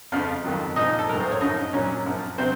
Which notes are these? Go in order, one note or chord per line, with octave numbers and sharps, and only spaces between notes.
F2 C#3 F3 F4 F5
F2 D#3 F#3
A#2 F3 D#4 D#5
A4
A2 F#3 A#4
C5
C#5
F#2 C#3 F3 D#4 D#5
A#2 F#3 C#4 C#5
F#2 F3
C3 F#3 C4 C5